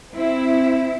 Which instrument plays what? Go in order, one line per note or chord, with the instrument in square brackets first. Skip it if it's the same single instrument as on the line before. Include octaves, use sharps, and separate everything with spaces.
[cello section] C4 E4